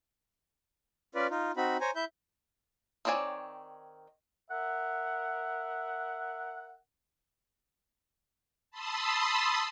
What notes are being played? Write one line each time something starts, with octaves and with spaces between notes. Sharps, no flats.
C#4 F4 B4 D5
D#4 F4
C4 D#4 F#4 B5
C5 C#5 G#5 A#5
E4 E5 G6
D#3 C4 C#5 D5 G#5
A#4 E5 F#5
A5 B5 C6 D#6 E6